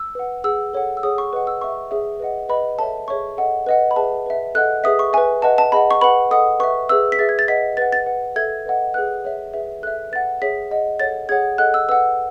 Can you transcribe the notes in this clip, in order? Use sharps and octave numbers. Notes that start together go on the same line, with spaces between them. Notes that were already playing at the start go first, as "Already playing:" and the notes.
Already playing: E6
B4 F#5
G#4 B4 F#5 E6
A4 C#5 F#5
E6
G#4 C#5 F#5 D#6
C#6
B4 D#5 F#5
E6
B4 E5 C#6
G#4 C#5 E5
B4 D#5 F#5
B4 D#5 F#5 B5
A4 C#5 E5 A5
G#4 C#5 E5 C#6
A4 D#5 F#5
B4 D#5 F#5
B5
G#4 B4 E5 A5
B4 E5
A4 D#5 F#5 F#6
G#4 B4 E5 D#6
C#6
B4 E5 G#5
B4 D#5 F#5 A5
A5
G#4 D#5 F#5 B5
C#6
B4 F#5 B5
A4 D#5 F#5 D#6
B4 E5 C#6
G#4 B4 E5 E6
B6
G#4 B4 E5 A6
G#6
A6
B4 D#5 F#5 B6
B4 F#5 A6
A6
B4 F#5
A4 E5 G#6
B4 D#5 F#5
G#4 B4 F#5 F#6
G#4 C#5 E5
G#4 B4 E5
A4 E5 F#6
B4 F#5 A6
G#4 C#5 E5 B6
G#4 D#5 F#5
A4 C#5 F#5 A6
G#4 C#5 F#5 G#6
A4 D#5 F#5 F#6
E6
B4 F#5 E6